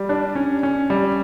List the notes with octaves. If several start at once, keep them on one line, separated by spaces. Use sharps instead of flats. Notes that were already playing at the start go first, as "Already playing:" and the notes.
Already playing: G3
D4
C#4
C#4
G3